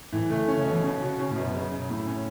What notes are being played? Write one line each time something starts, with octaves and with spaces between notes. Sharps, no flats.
A2 E3
C#3 A3
C#3 C#4
C#3
B2
E3
C#3 C#4
C#3 F#4
C#3 C#4
A2
F#2 B2
C#3
C#3
A2
C#4